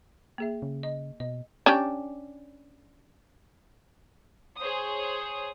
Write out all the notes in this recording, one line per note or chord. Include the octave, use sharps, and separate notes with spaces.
A#3 G#4 E5
C#3
D#5
B2 D#5
C#4 D4 G4
G#4 C5 C#5 D#6